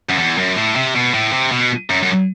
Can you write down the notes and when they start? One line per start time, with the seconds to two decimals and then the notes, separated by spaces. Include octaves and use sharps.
0.10 F#2
0.19 E2
0.38 F#2
0.56 A2
0.76 C3
0.95 B2
1.14 A2
1.32 C3
1.52 B2
1.90 F#2
2.02 F#2